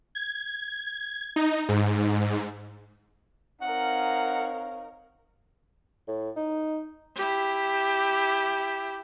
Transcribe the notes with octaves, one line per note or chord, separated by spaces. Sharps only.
G#6
D#4
G#2
C4 D#4 A#4 C#5 F5 F#5
A2
D#4
E4 G4